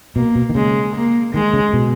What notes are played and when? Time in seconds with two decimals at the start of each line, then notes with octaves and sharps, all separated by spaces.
0.16 B2 A#3
0.35 B2
0.49 D#3
0.55 C#3 G#3
0.95 A#3
1.34 D#3 G#3
1.53 C#3
1.73 B2